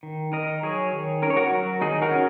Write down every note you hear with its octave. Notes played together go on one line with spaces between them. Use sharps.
D#3
D#3 A#4 D#5
F#3 G#4 C#5
D#3
C#4 A#4
C#5
F#4 A#4
F#3
D#3 D#4 G#4
F#4 A#4
C#4